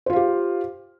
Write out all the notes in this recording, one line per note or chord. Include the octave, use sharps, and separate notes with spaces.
F4 G4 C5 F5